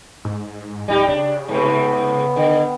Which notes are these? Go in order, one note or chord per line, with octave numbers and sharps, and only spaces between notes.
G#2
D1 G3 D#4 G4
C#3 D4
G#2 C3 A3 B3
D3